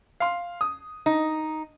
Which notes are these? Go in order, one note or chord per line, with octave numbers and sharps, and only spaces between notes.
F5 C6
D#6
D#4